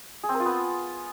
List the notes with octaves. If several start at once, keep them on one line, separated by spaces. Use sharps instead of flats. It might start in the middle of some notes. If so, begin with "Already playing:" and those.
G#4
C4
A#4
F4
B3